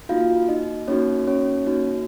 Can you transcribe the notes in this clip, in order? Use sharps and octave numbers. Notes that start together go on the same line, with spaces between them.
A#3 D#4 F4 F#4 F5
D#4 D#5
A#3 C#4 D#4 F#4 C#5
C#4 C#5
A#3 D#4 F#4